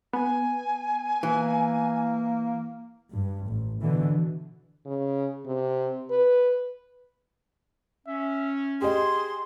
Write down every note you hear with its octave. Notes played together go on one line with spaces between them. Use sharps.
B3 G#5
E3 A#3
G2
A1
B2 D3 E3
C#3
C3
B4
C#4 E5
G4 G#4 D#5 C6